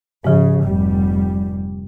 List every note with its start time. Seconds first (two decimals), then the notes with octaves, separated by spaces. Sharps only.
0.24 G#2 C#3 F3
0.61 F1 G3